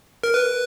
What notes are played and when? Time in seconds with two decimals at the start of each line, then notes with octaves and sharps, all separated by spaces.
0.24 A#4
0.34 B4